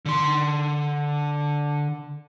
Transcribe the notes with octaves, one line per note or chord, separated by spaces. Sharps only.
D3 C6